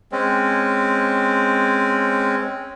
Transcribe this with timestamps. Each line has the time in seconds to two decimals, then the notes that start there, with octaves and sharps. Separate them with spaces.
0.12 G#3 C4 C#4